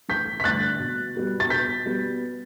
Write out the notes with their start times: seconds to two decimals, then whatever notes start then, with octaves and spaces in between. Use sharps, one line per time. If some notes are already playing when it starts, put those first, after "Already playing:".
0.09 A1 G6 B6
0.40 B6
0.44 G2 D3 A3 F#6 A6
0.79 B2
1.15 G3 B3 F#4
1.40 A6
1.50 B2 G6 B6
1.85 G3 B3 F#4